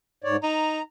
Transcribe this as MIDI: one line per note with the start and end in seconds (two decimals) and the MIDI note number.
0.24 0.36 44
0.24 0.36 73
0.24 0.36 74
0.43 0.80 63
0.43 0.82 82